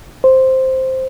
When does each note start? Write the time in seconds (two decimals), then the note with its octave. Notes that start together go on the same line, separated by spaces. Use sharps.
0.24 C5